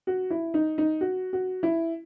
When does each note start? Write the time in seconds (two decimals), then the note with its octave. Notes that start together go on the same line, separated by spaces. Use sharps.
0.07 F#4
0.30 E4
0.54 D#4
0.78 D#4
1.01 F#4
1.33 F#4
1.63 E4